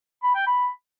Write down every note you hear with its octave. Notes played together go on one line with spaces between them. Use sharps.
B5
G5
B5